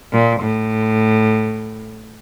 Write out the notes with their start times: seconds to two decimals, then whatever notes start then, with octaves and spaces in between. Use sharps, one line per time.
0.13 A#2
0.41 A2